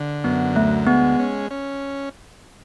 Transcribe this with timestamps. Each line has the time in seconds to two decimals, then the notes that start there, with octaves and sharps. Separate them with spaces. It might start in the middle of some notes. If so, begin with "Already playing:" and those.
Already playing: D3
0.24 F#2 B3
0.55 D2 A3
0.87 G#3 B3
1.19 C#4
1.51 C#4